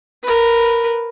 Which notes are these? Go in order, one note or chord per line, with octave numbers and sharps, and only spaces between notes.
A#4 B4